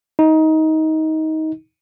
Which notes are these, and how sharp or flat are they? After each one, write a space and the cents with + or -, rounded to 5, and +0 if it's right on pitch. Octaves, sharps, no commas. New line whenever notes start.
D#4 +20